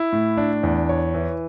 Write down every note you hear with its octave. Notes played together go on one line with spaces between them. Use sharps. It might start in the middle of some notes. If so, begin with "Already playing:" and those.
Already playing: E4
A2
D4
E2
C#5
E3